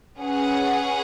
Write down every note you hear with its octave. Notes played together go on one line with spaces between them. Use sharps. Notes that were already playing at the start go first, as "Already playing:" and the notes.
C#4 G#4 B4 F#5